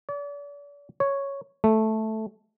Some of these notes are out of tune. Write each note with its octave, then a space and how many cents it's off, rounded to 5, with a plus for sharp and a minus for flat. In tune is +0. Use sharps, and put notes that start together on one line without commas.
D5 -40
C#5 +0
A3 -5